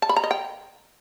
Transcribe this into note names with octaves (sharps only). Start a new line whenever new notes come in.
A5
B5
A#5
D#5
G5